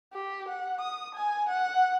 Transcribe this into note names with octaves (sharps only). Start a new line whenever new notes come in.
G4
F#5
D#6
G#5
F#5